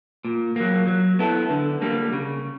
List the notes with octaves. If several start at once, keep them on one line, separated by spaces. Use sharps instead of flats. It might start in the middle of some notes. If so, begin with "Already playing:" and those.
A#2
F#3 A#3
F#3
B3 E4 A4
D3
G3 A#3
C#3